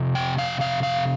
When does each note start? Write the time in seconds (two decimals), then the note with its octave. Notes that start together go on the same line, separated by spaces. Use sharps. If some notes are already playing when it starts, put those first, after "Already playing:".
Already playing: F2 C3
0.15 G5
0.38 F5
0.61 F5
0.83 F5